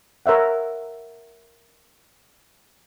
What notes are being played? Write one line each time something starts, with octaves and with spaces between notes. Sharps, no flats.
A#4 C#5 E5 F#5